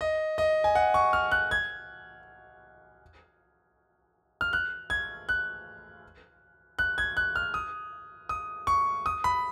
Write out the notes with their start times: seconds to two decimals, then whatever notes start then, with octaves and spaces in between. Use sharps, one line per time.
0.01 D#5
0.38 D#5
0.64 G#5
0.75 F#5
0.94 C#6
1.13 F6
1.31 F#6
1.51 G#6
4.41 F6
4.53 F#6
4.90 G#6
5.29 F#6
6.79 F#6
6.98 G#6
7.17 F#6
7.36 F6
7.54 D#6
8.29 D#6
8.67 C#6
9.06 D#6
9.24 B5